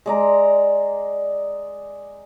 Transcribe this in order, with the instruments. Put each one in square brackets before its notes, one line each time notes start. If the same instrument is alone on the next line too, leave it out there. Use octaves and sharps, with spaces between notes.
[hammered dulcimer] G#3 D5 A#5